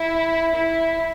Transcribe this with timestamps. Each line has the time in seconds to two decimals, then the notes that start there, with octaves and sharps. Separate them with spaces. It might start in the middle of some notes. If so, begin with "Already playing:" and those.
Already playing: E4
0.55 E4